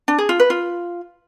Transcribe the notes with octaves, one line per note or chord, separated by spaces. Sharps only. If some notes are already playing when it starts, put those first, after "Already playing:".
D4
G#4
F4
B4
F4